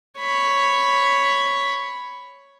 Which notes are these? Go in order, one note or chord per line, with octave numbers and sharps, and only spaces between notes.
C#5 B5